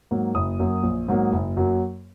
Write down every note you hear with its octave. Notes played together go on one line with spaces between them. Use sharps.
G#2 F#3 A#3
F#1 D#6
F#2 F#3 A#3
A#1
G#2 F#3 A#3
F#1
F#2 F#3 A#3